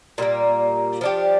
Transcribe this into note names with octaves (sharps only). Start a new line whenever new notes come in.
A#2 G3 A#3
F3 D4 G4